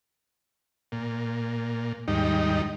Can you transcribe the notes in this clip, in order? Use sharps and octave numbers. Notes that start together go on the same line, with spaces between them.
A#2
D#2 G#2 G3 D#4